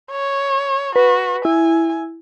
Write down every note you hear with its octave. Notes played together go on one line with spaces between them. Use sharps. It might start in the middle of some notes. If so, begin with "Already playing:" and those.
C#5
F#4 B4
E4 G#5